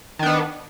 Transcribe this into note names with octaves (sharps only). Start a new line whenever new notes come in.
D#3 B3 D4